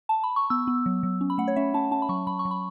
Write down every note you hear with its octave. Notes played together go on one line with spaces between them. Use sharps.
A5
B5
C#6
B3 E6
B3
F#3
F#3
C#4
B5
A3 F#5
C#5
C#4 E5
C#4 A5
C#4 A5
B5
F#3 C#6
F#3 B5
C#6
F#3
B5